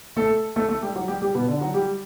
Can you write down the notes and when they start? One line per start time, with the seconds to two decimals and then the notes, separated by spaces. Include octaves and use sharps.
0.16 A3 A4
0.56 A3 A4
0.69 A3 A4
0.82 G3 G4
0.96 F#3 F#4
1.08 G3 G4
1.22 G3 G4
1.35 B2 B3
1.48 D3 D4
1.61 F#3 F#4
1.74 G3 G4